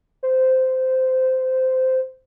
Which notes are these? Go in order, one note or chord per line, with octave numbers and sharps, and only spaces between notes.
C5